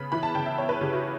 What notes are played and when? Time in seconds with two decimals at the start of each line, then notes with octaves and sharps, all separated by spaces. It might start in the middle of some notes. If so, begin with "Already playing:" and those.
Already playing: C#3 B3 B5
0.12 E3 B5
0.23 A5
0.35 C#3 G5
0.46 E5
0.58 B3 C#5
0.69 B4
0.81 C#3 G4
0.93 F#4